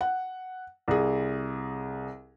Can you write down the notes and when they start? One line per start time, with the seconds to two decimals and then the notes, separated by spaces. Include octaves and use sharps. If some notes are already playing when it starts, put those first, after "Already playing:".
0.01 F#5
0.88 C2 G#4